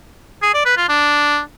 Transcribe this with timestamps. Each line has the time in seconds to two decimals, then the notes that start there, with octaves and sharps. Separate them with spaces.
0.42 G#4
0.54 D5
0.66 B4
0.77 F4
0.89 D4